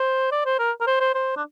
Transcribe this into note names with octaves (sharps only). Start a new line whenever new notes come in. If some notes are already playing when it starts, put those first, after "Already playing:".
Already playing: C5
D5
C5
A#4
A#4
C5
C5
C5
D4